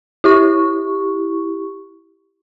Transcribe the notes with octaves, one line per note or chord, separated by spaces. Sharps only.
E4 G4 C#6